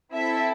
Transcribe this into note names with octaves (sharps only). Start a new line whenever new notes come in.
C4 E4 A4 E5